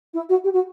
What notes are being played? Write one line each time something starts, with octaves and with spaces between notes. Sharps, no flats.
E4
F#4
G4
F#4